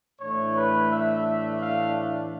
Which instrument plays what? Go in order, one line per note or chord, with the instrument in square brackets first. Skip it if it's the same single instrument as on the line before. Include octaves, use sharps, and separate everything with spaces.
[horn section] A2 E3 A3 D4 C#5
B4
E5
F5